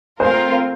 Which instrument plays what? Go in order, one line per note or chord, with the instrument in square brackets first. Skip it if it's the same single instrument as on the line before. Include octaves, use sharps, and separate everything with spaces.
[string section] A3 C4 F4 A#4 [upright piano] C5